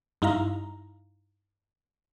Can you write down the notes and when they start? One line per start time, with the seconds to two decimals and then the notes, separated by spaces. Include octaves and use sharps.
0.22 G2 D#4 E4 F5 A#5